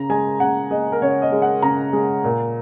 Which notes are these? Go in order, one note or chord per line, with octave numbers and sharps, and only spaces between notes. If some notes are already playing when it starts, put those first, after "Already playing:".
Already playing: C#3 A#5
G#3 G#5
C#3 F#5
G#3 D#5
A#4
C#3 C#5
D#5
G#3
F#5
C#3 A#5
G#3
A#2